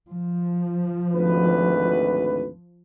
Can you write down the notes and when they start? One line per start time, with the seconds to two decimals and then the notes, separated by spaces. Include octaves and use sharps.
0.12 F3
1.14 G#1 D2 B4